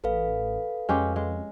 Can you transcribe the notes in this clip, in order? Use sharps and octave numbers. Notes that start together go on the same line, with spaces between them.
A1 A4 B4 F5
F2 G#3 C#4 G4
G#3